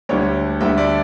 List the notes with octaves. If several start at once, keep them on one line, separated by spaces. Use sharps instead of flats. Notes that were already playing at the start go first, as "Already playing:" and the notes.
D2 D3 G3 C#5
D2 D3 G3 E5
D5